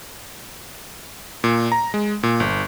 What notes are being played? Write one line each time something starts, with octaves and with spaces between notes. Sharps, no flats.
A#2
A#5
G#3
A#2
G1